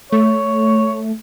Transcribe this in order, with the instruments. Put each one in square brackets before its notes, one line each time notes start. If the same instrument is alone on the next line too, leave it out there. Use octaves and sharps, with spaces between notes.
[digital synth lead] A3 [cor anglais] C#5